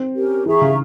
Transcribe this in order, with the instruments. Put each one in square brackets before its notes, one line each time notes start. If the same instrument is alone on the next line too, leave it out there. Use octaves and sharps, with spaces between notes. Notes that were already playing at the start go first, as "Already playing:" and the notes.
Already playing: [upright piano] C4
[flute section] C#4 G4 A#4
[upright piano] E3 [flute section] G#4 E5 A#5 C#6
[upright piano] C#3